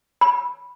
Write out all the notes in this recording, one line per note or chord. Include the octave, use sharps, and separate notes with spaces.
B5